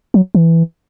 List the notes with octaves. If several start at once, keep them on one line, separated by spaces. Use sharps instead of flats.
F#3
E3